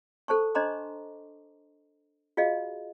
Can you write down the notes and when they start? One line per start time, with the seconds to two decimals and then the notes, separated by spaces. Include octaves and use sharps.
0.28 A4 C5 A5 C#6
0.55 D4 C5 D#5 A#5 C6 D6
2.37 F4 F#4 G#4 D#5 F5